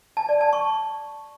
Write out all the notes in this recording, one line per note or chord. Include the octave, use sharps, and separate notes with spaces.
A5
D5
A5
C#6